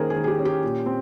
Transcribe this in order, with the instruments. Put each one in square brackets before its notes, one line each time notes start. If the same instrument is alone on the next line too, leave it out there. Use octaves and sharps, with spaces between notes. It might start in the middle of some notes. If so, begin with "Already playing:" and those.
Already playing: [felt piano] D#3 A#3 C#4 G#4 A#4 C5
G#4
D#3
G#4
G4
C#4
G4
A#2
C4